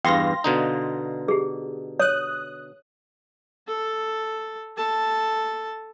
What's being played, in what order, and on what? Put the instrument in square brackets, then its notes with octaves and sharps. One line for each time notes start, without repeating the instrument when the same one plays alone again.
[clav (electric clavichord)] E2 G2 [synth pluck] F5 C6 A#6 [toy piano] G5
[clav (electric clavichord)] B2 D3 D#4
[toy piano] G4 G#4
[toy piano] C#5 [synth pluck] D#6 F#6
[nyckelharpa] A4 A5
A4 A5